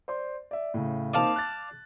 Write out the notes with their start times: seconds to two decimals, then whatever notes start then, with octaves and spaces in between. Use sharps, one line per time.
0.08 C5 D5 C6
0.51 D5 E5
0.74 A2 C#3
1.14 A#3 C4 D#4 D5 F5 A5
1.36 F#6 A6